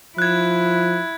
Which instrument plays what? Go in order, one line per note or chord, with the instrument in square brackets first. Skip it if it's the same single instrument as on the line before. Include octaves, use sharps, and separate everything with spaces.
[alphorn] F3 [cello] E4 [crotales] F#6 G#6